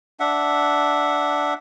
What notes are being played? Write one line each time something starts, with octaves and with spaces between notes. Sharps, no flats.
D4 E5 F#5